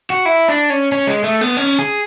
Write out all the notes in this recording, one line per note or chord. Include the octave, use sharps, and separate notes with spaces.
F#4
E4
D4
C#4
C#4
G#3
A3
B3
C#4
G#4